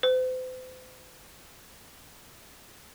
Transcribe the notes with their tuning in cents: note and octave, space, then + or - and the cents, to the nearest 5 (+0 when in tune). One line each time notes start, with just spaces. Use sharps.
C5 -40